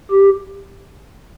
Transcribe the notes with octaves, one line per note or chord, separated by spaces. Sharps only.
G4